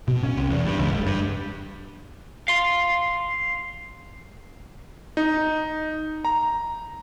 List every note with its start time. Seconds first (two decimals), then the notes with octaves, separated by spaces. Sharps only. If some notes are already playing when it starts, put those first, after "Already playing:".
0.08 B2
0.23 C#4
0.37 C2
0.50 E2
0.65 G2
0.79 C#2
0.92 F#1
1.06 G2
2.48 F5 C6
5.17 D#4
6.25 A#5